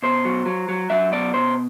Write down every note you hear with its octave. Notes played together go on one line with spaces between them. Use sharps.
B2 C5
F#3
F#3
F#3
F#3 E5
B2 D5
B2 C5